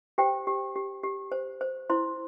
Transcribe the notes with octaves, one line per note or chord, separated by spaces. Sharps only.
G4 C5 G5
G4
G4
G4
C5
C5
E4 C5 C6